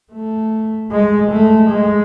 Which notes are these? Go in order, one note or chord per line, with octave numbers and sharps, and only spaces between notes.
A3
G#3
A3
G#3